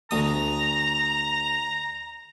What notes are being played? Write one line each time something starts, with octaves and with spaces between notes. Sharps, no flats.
D2 A#5 D#6